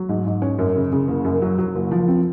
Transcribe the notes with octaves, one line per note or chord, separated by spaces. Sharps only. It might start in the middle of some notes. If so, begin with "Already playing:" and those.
Already playing: F#3
G#2
G#2
C#4
F#2
C#3
C#3
F#1
F#2
F#3
F#3
F#1
F3
C4